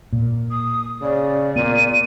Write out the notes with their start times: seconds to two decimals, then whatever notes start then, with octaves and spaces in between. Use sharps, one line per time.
0.13 A#2
0.51 D#6
1.02 C#3 D5
1.56 A#2 B3 D#7